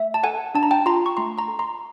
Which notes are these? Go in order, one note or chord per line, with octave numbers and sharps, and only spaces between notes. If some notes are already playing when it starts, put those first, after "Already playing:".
Already playing: A3 E5
A5
A4 F#5 G#5
D4 A5
A#5
G5 A5
F4 A#5 C6
C#6
A3 A#5 C6
A#5 C6
A4
A#5 C6